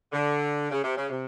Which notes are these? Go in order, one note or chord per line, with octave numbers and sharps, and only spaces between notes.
D3
C#3
C3
C#3
C3